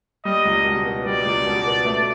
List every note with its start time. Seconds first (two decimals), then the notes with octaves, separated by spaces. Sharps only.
0.24 G3 D#5
0.45 C#2
0.64 B2
0.85 B3
1.05 G3 D5
1.25 C#2
1.45 B2
1.66 B3
1.85 A3